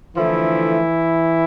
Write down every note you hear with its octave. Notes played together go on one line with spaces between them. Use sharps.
D3 E3 F3 A3 E4